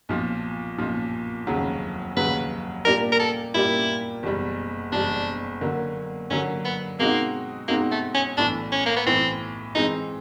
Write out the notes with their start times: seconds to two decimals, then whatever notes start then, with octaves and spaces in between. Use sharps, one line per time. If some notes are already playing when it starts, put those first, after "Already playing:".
0.09 B1 A#2 F3
0.78 B1 A#2 F3
1.47 F1 D#2 C#3 F#3
2.16 F1 D#2 C#3 F#3 B4
2.85 A#2 G3 A#3 D4 G4 A#4
3.12 A#4
3.20 A4
3.54 A#2 G3 A#3 D4 E4 G4
4.23 F#1 E2 B2 G3
4.92 F#1 E2 B2 G3 D4
5.61 D3 F#3 A#3
6.30 D3 F#3 A#3 C#4
6.65 B3
6.99 B2 G#3 A#3 C4 D#4 F#4
7.68 B2 G#3 A#3 C4 D#4 F#4
7.91 A3
8.14 C#4
8.37 B1 A2 E3 D4
8.72 C#4
8.86 A#3
8.96 B3
9.06 B1 A2 E3 C4
9.75 E3 G#3 C4 D#4